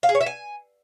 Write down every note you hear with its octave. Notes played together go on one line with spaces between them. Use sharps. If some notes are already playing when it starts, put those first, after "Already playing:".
F5
G#4
C#5
E5
G#5